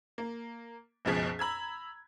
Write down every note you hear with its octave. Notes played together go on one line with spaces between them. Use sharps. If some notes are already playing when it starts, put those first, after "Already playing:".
A#3
F#1 C#2 B2 F3 G#4 B6
A#5 B5 E6 G#6